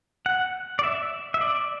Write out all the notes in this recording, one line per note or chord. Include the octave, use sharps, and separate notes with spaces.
F#5
D5
E5
E5
D5